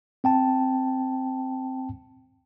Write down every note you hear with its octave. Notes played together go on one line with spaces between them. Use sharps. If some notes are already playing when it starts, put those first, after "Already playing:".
C4 G5 A5